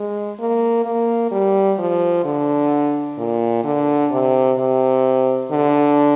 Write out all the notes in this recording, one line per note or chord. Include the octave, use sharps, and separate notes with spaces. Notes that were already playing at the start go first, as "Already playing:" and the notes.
Already playing: G#3
A#3
A#3
G3
F3
D3
A#2
D3
C3
C3
D3